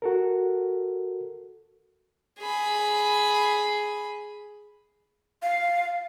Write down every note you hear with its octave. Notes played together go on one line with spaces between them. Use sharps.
F#4 A4 A#4
G#4 B5
F5